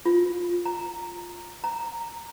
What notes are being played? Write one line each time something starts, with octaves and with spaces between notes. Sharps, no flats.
F4
A#5
A#5